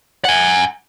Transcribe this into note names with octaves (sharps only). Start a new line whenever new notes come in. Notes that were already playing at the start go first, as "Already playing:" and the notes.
F#5 G#5